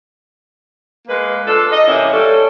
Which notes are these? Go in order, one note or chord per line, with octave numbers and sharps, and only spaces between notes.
G#3 A#3 B4
D4 F4 A4
D#5
C3 E3 A#3 C#4 E4
G3 C#4 A4